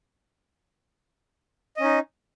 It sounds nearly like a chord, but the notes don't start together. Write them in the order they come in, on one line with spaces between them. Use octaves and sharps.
D#5 C#4 D#4